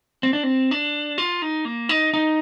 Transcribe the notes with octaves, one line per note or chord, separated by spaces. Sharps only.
C4
D4
C4
D4
F4
D#4
A#3
D#4
D#4